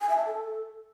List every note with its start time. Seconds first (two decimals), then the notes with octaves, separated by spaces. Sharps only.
0.01 G#5
0.09 E5
0.17 A5
0.26 A4